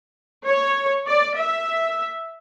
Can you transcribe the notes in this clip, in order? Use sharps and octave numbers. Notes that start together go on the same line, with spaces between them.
C#5
D5
E5